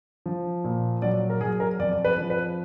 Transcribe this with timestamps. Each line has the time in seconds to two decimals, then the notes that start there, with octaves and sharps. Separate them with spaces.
0.26 F3
0.64 A#2
1.02 F#3 D5
1.30 A#4
1.41 F#3 G#4
1.60 A#4
1.79 F2 D5
2.05 B4
2.18 F3
2.30 B4